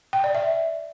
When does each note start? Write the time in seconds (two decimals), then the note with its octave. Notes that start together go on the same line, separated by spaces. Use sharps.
0.13 G5
0.24 D5
0.35 E5